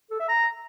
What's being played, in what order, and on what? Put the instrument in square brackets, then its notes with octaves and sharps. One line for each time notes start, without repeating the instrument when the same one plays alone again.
[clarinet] A4
E5
A#5